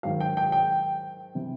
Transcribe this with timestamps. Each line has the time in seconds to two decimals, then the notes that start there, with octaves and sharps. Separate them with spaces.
0.03 G#2 D#3 F#3 F5
0.20 G5
0.37 G5
0.52 G5
1.35 C3 E3